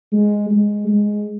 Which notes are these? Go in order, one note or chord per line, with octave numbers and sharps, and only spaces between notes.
G#3
G#3
G#3